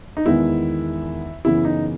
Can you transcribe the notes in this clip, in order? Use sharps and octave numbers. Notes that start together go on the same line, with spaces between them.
D#4
E2 D#3 G#3 B3 E4
F#2 C#3 E3 B3 E4
D#4